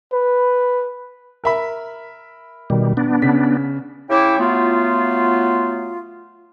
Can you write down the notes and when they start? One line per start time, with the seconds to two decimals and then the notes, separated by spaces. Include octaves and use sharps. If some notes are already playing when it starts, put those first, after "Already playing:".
0.13 B4
1.44 A#4 E5 B5
2.70 B2 D#3 G3
2.97 B3 D4
3.22 C#3 B6
4.10 C#3 E4 C#5 G5 D6
4.39 F#3 A3 B3 F4